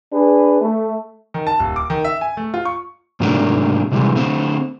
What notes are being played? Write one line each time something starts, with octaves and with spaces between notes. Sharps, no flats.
D4 G#4 B4
A3
D#3
A5
D#1
D6
D#3
E5
G#5
A3
F4
C#6
G#2 C3 F#3 A3 A#3 D4
C3 E3 G3 G#3
D3 A3 C4